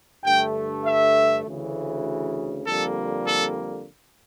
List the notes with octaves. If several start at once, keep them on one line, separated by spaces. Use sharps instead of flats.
G2 D3 A3 G5
E5
D2 C#3 E3
F2 D3 G3 A#3 A4
A4